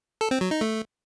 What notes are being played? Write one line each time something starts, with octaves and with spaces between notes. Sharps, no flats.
A4
C4
F#3
D#4
A3